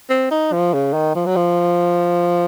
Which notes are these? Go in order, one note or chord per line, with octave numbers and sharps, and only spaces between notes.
C4
D#4
F3
C#3
D#3
F3
F#3
F3